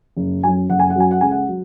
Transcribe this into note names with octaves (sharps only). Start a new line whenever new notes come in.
F#1
F#2 F#3 G#5
F#1 F#5
G#5
F#5
F#2 F#3 G#5
F#5
C#2 G#5
F#5
F#3